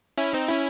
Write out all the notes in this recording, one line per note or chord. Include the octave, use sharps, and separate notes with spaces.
C#4 E4
C4 D#4
C#4 E4